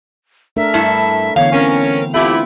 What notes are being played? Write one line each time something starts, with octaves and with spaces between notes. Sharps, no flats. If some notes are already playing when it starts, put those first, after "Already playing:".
A3 D4 A#4 E5
G2 E4 A4
D3 E3 B3 C#5 F5
C4 C#4 A#4
D3 A3 C4 E4 F4 G4